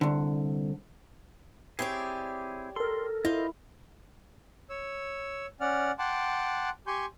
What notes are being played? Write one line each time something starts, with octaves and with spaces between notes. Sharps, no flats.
C2 D3
C4 E4 G4 G#4 C#5 D5
A4 A#4 C6
E4 F4 C5 D#5
C#5 E6
C#4 D5 F#5 F6
F#5 G5 A5 C6 D6 F#6
G4 G#5 C6 C#6 G6